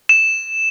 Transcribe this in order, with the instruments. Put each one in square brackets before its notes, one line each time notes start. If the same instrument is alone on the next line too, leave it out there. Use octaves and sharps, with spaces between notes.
[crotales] E7